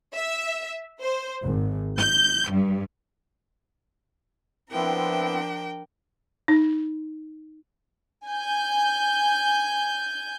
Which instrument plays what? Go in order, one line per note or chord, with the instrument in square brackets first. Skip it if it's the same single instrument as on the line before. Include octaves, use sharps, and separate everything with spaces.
[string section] E5
C5
G#1
G6
G2
[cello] F3 D4 [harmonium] B3 C4 E4 [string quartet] A#4 G5
[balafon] D#4
[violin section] G#5 G6